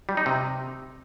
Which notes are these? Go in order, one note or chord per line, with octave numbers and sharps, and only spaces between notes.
G3
D#4
C3